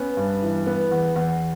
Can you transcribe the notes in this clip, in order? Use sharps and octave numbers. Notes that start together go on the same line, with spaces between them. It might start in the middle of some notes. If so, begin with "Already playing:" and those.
Already playing: B3 C#4
G2
E3
B3
E2
E2